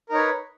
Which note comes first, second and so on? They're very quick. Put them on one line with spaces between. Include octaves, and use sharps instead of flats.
A#4 D#4 C#5 B4